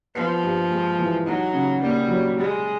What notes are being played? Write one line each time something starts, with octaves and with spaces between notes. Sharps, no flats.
F3 B3
G2
G#3
E3
F#3 D#4
C#3
G3 A#3
F#3
G3 G#3